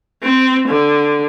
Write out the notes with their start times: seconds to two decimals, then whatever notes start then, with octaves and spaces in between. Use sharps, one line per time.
0.23 C4
0.68 D3